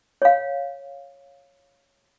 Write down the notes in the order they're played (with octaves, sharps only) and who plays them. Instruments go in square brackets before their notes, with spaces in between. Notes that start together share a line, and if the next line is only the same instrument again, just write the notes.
[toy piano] C#5 F5